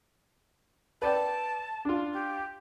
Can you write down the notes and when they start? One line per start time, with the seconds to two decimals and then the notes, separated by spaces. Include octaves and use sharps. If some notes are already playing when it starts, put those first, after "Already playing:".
1.02 B4 D5 G5 A5
1.85 D4 F4
2.13 G4